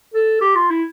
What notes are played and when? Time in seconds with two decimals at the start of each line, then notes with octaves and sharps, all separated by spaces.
0.14 A4
0.41 G4
0.55 F4
0.70 E4